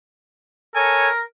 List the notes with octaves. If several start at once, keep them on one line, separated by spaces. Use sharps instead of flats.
A4 A#4 C#5 G#5